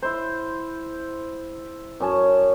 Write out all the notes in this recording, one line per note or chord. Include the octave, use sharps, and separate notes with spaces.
E4 C5
F#2 C#4 A5